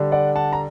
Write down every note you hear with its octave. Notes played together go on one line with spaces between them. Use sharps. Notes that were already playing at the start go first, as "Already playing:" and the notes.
Already playing: D3 G3 D4
D5 F#5
F#5 A5
A#5